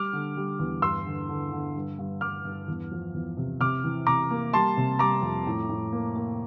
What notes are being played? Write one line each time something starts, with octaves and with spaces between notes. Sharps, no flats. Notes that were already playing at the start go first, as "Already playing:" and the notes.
Already playing: G3 D6 F6
D3
G3
E2
G2 C6 E6
D3
D3
D3
G2
G2
G2 D6 F6
G2
E2
F3
E2
C3
C3 D6 F6
E3
C3 A#5 D6
A#3
G3 A5 C6
C3
G3 A#5 D6
F2
A2
A2
A#3
A#3